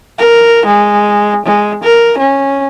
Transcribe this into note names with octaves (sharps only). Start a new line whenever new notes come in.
A#4
G#3
G#3
A#4
C#4